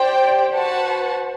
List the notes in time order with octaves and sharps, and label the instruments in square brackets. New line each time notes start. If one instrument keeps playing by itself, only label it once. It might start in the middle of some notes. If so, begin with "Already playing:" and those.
Already playing: [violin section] G4 D5 G5 [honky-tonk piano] C5
[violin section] F#4 B4 F#5 A5